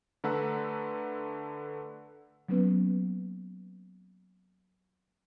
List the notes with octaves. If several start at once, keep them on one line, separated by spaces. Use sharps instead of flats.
D3 A3 B4 F#5 A#5 E6
F#3 A#3 B3 C#4 B4